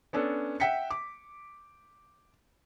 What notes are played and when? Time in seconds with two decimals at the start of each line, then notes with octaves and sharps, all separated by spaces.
0.13 B3 C#4 D4 A4
0.60 E5 F#5 G5 B6 C#7
0.91 D6